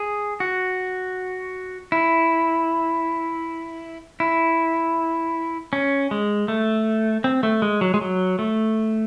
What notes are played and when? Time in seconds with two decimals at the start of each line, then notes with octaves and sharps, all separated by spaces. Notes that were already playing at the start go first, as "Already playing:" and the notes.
Already playing: G#4
0.40 F#4
1.92 E4
4.20 E4
5.73 C#4
6.11 G#3
6.48 A3
7.24 C4
7.43 A3
7.62 G#3
7.81 F#3
7.94 G#3
8.01 F#3
8.39 A3